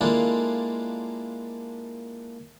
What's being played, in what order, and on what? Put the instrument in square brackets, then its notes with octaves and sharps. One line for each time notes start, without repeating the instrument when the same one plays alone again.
[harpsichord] G#3 A#3 D4 E4 F4 A4